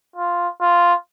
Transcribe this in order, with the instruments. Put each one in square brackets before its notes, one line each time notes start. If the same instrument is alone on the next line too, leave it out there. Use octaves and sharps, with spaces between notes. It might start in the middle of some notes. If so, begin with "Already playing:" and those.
[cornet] F4
F4